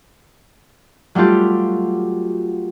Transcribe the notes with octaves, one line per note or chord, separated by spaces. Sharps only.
F#3 G3 A3 F4 G4